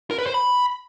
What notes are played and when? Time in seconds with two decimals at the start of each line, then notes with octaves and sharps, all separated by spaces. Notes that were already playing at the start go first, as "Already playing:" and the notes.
0.11 A#4
0.19 B4
0.26 C5
0.34 B5